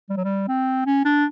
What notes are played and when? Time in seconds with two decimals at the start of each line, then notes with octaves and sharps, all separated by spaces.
0.10 G3
0.17 F#3
0.24 G3
0.48 C4
0.86 C#4
1.05 D4